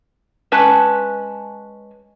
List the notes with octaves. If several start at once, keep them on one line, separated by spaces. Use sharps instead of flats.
G#3 C#4 B4 A5